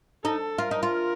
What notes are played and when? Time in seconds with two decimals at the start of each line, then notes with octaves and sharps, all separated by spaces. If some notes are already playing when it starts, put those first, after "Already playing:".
0.24 D#4 A4
0.58 F4 A#4
0.71 D#4
0.83 F4